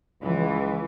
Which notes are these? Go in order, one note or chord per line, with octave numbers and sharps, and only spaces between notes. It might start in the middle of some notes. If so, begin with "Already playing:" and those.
C#2 E3